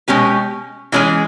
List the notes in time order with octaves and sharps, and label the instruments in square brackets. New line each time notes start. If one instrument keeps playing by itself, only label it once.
[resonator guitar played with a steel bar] B2 G#3 C#4 G4 B4
E3 G#3 C#4 G#4